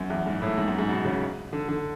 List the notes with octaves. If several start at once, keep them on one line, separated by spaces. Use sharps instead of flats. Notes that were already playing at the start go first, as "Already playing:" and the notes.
Already playing: F#2
E2
G#2
A2
G#2
F#2
G#2
B2
C#3
D3
D3